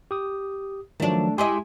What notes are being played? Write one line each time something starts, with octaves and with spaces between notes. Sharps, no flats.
G4 D#6
D#3 F3 F#3 A3 D4
G#3 E4 G4 D#5 G#5 C6